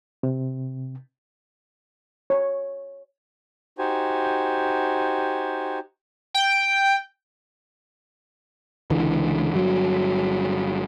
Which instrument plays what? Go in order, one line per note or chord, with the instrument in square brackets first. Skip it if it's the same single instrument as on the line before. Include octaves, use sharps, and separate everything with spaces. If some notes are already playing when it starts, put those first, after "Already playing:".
[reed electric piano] C3
[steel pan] C#5
[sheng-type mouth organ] D#4 F#4 G4 C5 G#5
[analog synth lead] G5
[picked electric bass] C#2 D3 E3
G1 F#3